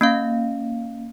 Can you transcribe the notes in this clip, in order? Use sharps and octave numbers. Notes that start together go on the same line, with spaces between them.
A#3 C#4 F5